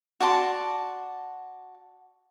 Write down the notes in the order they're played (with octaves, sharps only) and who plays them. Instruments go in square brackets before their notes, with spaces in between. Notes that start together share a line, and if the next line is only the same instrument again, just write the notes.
[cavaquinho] F#4 D5 A5 C6